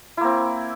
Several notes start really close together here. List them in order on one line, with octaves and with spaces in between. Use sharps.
E4 A#3 C4